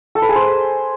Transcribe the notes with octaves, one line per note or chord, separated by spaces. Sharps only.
A4
B4
G#4
C5